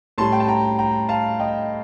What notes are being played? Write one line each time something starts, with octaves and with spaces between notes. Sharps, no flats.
A2 G3 A5 C6
G5
A5
G5 A#5
G5 A#5
F5 A5
D#5 G5